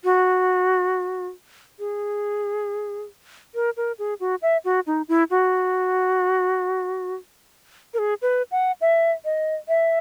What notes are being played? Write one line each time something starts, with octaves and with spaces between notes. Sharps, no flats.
F#4
G#4
A#4
A#4
G#4
F#4
E5
F#4
D#4
E4
F#4
A#4
G#4
B4
F#5
E5
D#5
E5